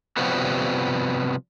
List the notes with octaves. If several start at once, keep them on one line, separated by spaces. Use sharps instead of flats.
C3 F3 G3 B3 F#4